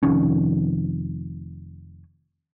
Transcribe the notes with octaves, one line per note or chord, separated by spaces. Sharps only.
F1 F2 D#3 C#4